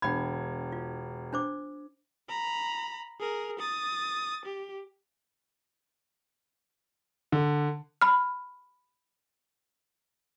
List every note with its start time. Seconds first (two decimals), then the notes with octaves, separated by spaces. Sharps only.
0.02 E1 D4 G5 B5 G#6
0.72 F4
1.33 D4 C5 D6
2.29 A#5 B5
3.20 G#4 A#4
3.59 D#6 A6
4.45 G4
7.32 D3
8.02 B5 F6